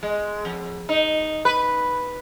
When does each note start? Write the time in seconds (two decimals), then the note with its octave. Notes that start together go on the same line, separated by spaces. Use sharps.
0.03 G#3
0.45 F2
0.89 D#4
1.45 B4